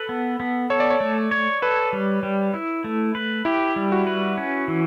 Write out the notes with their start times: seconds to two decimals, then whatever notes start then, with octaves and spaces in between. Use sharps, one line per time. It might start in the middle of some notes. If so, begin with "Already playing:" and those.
Already playing: A4 B4
0.09 B3
0.40 B3
0.70 A4 C#5
0.80 D5
0.90 C#5
1.00 A3
1.31 C#5
1.62 A4 B4
1.93 G3
2.23 G3
2.54 E4
2.84 A3
3.15 B4
3.45 E4 G4
3.76 G3
3.92 F#4
4.07 B4
4.38 C#4
4.68 E3